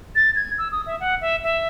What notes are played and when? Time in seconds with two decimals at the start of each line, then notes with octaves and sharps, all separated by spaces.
0.15 A6
0.36 G#6
0.58 E6
0.72 D#6
0.86 E5
1.00 F#5
1.21 E5
1.44 E5